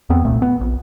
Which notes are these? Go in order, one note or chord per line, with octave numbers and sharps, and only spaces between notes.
E2 B3 C4
D#1 C2 A#2 A3
B3
A#1